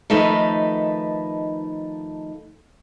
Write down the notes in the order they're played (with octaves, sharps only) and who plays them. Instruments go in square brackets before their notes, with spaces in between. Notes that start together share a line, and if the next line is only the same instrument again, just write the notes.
[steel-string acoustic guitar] D#3 F3 A3 D#4 A4 B4